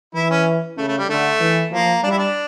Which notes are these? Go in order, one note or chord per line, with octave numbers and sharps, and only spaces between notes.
E3 E4
C#4
C#3 A3
A3
G3
D3 A3
E3
F3 A#3
G3 D4
E4
D4